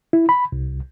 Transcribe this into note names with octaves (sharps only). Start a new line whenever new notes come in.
E4
B5
C2